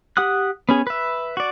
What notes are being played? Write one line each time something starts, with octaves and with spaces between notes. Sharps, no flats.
G4 F#5 D#6 F#6
B3 C#4 G#4
B4 E5
F#4 D5